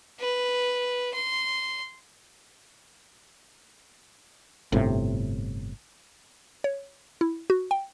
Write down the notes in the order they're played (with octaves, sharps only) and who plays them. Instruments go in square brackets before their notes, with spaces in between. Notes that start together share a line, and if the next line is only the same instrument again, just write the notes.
[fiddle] B4
C6
[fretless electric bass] G1 A2 C3
[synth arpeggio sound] C#5
E4
F#4
G5